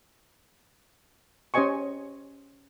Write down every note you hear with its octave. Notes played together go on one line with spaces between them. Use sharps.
C#4 G4 C5 D#5 G#5 C#6